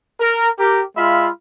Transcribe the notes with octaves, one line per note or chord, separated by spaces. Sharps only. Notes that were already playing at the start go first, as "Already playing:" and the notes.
A#4
G4 A#4
G#3 F4 E5 F5 B5